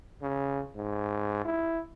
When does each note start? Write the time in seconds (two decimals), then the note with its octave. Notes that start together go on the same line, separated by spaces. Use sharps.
0.22 C#3
0.76 G#2
1.45 E4